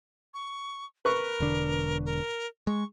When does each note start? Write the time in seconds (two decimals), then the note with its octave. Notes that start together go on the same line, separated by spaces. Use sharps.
0.34 C#6
1.05 A#4 B4 C#6
1.40 E1 D3 D4
2.05 A#4
2.67 G#3 C#6